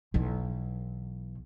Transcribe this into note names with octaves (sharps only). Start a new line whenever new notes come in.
B1 E3